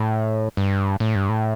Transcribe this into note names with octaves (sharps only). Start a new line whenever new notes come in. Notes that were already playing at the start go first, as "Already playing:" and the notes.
Already playing: A2
G2
A2
G2
A2